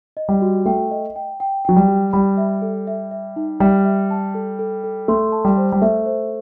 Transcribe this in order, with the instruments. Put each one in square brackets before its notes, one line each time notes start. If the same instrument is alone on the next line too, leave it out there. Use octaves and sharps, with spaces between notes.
[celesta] D#5
[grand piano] G3
[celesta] F#4
[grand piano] A3 [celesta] G5
[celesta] D#5
G5
G5
[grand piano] F#3 [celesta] G5
[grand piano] G3
[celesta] G4
[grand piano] G3 [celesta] B5
[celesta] E5
A4
E5
E5
D#4
[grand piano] G3 [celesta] E5
[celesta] E5
A5
A4
A4
A4
[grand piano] A3 [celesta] C6
[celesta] A5
[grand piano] G3
[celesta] C5
[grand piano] G3
[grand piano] A3 [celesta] E5
[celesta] C5